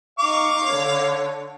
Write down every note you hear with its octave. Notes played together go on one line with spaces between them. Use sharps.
D#4 F5 C#6 D6
D3 C#5